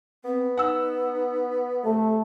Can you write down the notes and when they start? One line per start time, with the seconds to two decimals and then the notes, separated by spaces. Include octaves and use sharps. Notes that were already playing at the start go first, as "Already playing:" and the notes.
0.25 B3 C4
0.57 D#4 F#5 E6
1.85 C3 A3 A4